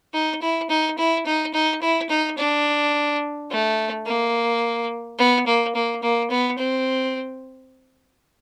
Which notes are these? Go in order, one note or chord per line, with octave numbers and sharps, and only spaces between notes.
D#4
E4
D#4
E4
D#4
D#4
E4
D#4
D4
A3
A#3
B3
A#3
A#3
A#3
B3
C4